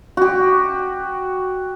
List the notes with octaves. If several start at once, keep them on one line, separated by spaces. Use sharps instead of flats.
F#4 G4